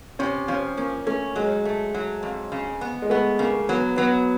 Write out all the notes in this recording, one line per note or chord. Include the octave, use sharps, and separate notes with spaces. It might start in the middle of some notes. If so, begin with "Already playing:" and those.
C3 C#4
F3 C#4
A#3 C#4
A3 C#4
F#3 G#3
A3
F#3
F2
C#3
B3
G#3
A3 B3
C#3 A#3
F#3 B3
F#3 B3